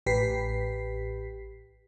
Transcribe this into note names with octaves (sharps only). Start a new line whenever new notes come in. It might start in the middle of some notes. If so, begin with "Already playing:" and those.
A1 G4 B4 B6 C7